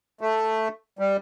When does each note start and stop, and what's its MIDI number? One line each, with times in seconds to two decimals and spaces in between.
0.21 0.68 57
0.99 1.17 55